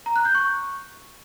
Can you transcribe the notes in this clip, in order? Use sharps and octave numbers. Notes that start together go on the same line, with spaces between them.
A#5
F#6
G6
C#6